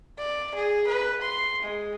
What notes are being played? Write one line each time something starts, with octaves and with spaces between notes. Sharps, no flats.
D5
G#4
B4
C6
G#3